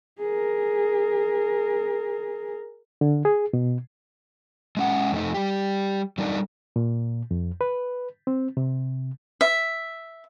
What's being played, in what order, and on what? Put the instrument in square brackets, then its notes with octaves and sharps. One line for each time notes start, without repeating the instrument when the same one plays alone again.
[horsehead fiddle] G#4 A#4
[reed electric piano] D3
G#4
B2
[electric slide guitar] G#3 C#4 F#5
F2 A3 D#4
G3 G4
F#3 G3 D4 D#4 A4 D5
[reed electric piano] A#2
F2
B4
C4
C3
[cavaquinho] E5